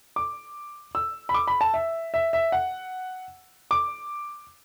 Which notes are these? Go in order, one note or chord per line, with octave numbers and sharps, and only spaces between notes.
D6
E6
B5
D6
B5
A5
E5
E5
E5
F#5
D6